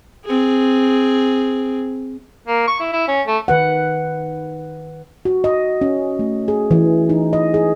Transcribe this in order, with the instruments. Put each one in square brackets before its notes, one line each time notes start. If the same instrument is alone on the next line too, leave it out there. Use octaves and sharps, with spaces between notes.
[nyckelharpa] C4 G#4
[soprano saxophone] A#3
C#6
E4
E4
C#4
A3
[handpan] D#3 B4 F#5
F#4
D#5
C#4
A3
G#4
E3
D#4
D#5
G#4